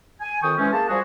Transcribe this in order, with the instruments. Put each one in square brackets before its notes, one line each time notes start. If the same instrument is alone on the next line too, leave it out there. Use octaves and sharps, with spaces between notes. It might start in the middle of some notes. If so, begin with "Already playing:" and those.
[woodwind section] G#5
F2 D#3 G5 C#6 D#6
E3 G#3 C4 C#4
A#3 G#4 A5
F3 G3 F#4 G#4